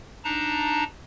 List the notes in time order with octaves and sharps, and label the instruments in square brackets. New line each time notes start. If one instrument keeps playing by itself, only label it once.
[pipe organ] D4 D#4 A5 A#5